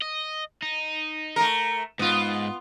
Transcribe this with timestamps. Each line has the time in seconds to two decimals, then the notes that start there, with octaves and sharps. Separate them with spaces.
0.02 D#5
0.62 D#4
1.36 A3 A#4
1.99 G#2 B3 F4